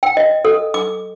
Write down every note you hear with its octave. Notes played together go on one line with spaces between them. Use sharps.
G5
D#5
A4
D6